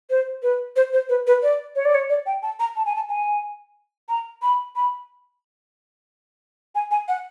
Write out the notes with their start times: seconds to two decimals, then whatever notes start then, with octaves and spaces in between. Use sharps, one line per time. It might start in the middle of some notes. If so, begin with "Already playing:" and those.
0.10 C5
0.43 B4
0.76 C5
0.93 C5
1.09 B4
1.27 B4
1.43 D5
1.76 C#5
1.85 D5
1.94 C#5
2.09 D5
2.26 G5
2.43 A5
2.60 A#5
2.76 A5
2.86 G#5
2.96 A5
3.09 G#5
4.09 A#5
4.42 B5
4.76 B5
6.75 G#5
6.91 G#5
7.08 F#5